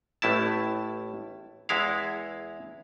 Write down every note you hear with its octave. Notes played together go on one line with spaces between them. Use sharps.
A1 A2 E4 A5
E2 G#3 E4 F5